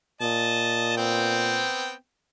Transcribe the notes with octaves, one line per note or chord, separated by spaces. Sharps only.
A#2 D#5 A5
B3 C4 G5